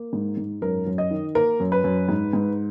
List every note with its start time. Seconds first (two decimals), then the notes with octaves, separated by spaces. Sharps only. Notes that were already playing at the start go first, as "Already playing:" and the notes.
Already playing: A#3
0.13 G#2
0.37 G#2
0.62 F#2 A#4
0.87 F#2
0.98 D#5
1.11 D#3
1.35 A#3 A#4
1.60 F#2
1.72 B4
1.84 F#2
2.09 G#2
2.33 G#2